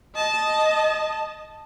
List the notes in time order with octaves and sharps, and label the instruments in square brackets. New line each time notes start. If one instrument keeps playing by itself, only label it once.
[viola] D#5 A5